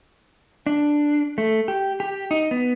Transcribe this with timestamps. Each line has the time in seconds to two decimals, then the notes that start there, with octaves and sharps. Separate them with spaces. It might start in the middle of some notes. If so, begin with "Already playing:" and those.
0.67 D4
1.38 A3
1.68 G4
2.00 G4
2.31 D#4
2.51 B3